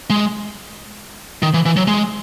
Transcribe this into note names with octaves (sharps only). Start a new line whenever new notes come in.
G#3
D#3
E3
E3
F#3
G#3